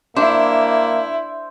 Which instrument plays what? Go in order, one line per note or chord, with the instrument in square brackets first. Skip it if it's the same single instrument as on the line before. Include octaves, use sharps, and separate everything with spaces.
[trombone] A#3 [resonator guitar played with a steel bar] D4 [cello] E4 [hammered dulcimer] C5 E5